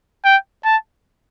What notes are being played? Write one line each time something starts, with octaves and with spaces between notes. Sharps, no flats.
G5
A5